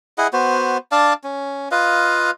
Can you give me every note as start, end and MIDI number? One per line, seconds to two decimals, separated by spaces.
0.18 0.27 64
0.18 0.27 68
0.18 0.27 75
0.18 0.27 78
0.33 0.78 59
0.33 0.78 66
0.33 0.78 72
0.92 1.13 62
0.92 1.13 74
0.92 1.13 77
0.92 1.13 81
1.24 1.69 61
1.71 2.31 65
1.71 2.31 71
1.71 2.31 75
1.71 2.31 77